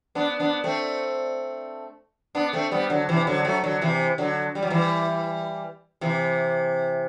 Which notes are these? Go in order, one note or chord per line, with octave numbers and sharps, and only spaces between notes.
B3 D4
B3 D4
A3 C4
B3 D4
A3 C4
G3 B3
D3 F#3
C3 E3
D3 F#3
F#3 A3
D3 F#3
C3 E3
D3 F#3
G3
F#3
E3 G3
C3 E3